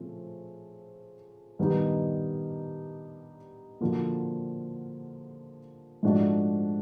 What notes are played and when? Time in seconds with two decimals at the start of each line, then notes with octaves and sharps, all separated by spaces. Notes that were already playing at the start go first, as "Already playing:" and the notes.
Already playing: C#3 F3 A3 C4
1.59 G2 D#3 G3 B3 D#4
3.81 D3 F3 A#3 D4 F#4
6.03 G#2 F3 A3 D4 F#4